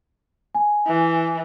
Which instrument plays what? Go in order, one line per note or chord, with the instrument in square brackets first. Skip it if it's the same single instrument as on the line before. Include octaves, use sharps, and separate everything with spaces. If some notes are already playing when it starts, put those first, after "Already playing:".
[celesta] G#5
[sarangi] E3